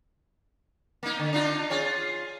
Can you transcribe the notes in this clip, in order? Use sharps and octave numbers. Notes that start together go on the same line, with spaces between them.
A#3 D#4
D3
D4 D#4 F4
F4 G#4 C#5